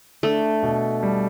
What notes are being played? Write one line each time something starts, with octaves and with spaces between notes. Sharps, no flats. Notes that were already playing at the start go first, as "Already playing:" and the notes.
A3 D4
B2
G3